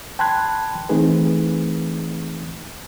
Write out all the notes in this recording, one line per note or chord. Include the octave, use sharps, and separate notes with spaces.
G5 A5 B5 C6 F#6 G#6
E3 A3 C4 D#4 G#4 B4